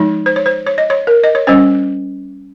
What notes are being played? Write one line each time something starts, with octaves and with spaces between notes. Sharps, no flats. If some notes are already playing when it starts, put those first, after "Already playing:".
Already playing: F3 G#3 D#4
C5
C#5
C5
C#5
D#5
C#5
A#4
D#5
C#5
G3 C#4 C5